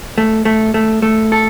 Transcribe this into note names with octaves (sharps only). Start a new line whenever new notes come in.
A3
A3
A3
A3
A4